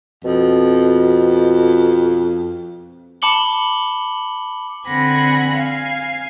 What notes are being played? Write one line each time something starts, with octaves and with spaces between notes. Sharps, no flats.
F2 B2
A5 B5 D6 C#7 F#7 G7
D3 C4 F#5 G#5 B5 A#6
F5 G#5